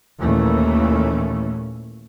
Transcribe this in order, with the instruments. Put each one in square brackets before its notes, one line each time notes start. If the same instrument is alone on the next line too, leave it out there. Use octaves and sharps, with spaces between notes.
[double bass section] D#2 A#2 E3 A3 C#4